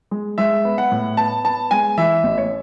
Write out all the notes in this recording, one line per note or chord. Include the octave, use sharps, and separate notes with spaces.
G#3
G#3 E5
B3
F#5
A2
B3 A5
B3 A5
G#3 G#5
E3 E5
A1
C#5